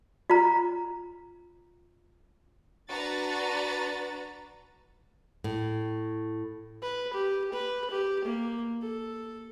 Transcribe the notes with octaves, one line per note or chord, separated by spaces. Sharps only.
F4 A#5
D4 F#4 B4 A#5 A6
A2
B4
G4
B4
G4
A#3
A4